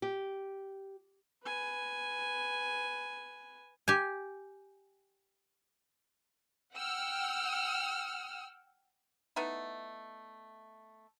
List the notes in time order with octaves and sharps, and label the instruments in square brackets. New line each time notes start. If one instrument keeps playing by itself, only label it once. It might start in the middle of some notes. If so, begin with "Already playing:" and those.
[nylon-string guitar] G4
[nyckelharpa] B4 G#5
[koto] G4 G#5
[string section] F#5 G5 E6 F6
[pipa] A3 B3 D#4 E4